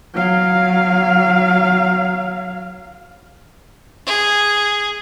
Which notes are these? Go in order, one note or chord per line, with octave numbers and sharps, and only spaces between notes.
F#3 F5
G#4